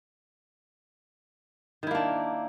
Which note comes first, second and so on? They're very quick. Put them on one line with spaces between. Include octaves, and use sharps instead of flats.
D#3 E4 A#3 D4